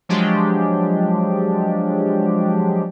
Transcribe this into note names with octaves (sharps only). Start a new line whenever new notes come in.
F3 F#3 G#3 D4 G4